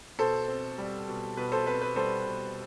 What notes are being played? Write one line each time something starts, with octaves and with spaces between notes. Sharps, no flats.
B2 A4 C5
C4
G3
B2
B2 B4
A4 C5
C4 B4
B4
G3 A4 C5
B2